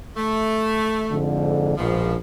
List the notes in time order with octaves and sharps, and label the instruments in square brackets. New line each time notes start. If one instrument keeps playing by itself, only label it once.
[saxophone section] A3
[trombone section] F2 G#2 D3
[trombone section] A#1 [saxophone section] G#2 B2 F3